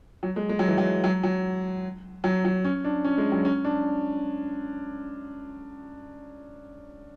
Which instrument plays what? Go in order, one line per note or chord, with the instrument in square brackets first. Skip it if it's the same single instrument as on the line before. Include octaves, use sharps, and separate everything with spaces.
[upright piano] F#3
G#3
G#3
F#3
E3
F#3
F#3
F#3
F#3
F#3
C#4
D4
C#4
G#3
F#3
C#4
D4